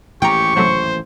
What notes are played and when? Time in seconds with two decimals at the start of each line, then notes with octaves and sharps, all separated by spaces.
0.22 A1 D#2 G#2 G4 G5 A#5 C#6
0.56 C3 F#3 A3 C5